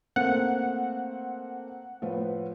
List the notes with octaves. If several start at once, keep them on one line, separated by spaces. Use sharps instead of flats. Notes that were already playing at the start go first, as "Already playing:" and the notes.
A3 A#3 C4 F#5
A2 F3 B4